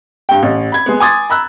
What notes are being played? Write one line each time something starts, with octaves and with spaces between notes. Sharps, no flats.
G2 G5
A1
B5 G#6
G#3 B3
G#5 C6 D6 D#6 G#6 A6
A#5 B5 E6 F#6